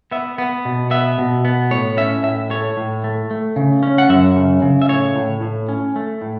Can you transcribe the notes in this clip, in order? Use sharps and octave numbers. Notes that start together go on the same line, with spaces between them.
B3 E5
B3
B2
B3 E5
B2
B3
A2 C#5
C#4 E5
A2 E5
A3 C#5
A2
A3
A3
C#3
C#4
F#5
F#2 E5
C#3
C#3
E5
A2 C#5
A2
A2
C#4
A3
A2